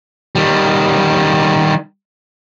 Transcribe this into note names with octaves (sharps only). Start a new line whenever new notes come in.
D#3 G3